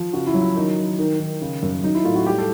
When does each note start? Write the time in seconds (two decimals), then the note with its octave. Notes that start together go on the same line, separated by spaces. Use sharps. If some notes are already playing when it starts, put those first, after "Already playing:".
Already playing: F3
0.13 C#3 F#4
0.27 E4
0.34 F#3
0.42 E4
0.55 D#3 D#4
0.77 D#3
0.99 D#3
1.20 D#3
1.42 C#3
1.62 F#2
1.83 F#3 D#4
1.95 E4
2.04 A2 F4
2.16 F#4
2.26 G3 G4
2.38 A4